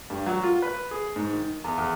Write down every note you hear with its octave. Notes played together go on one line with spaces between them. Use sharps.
G2
F#3
F4
B4
G#4
G#2
D#3
E2
E2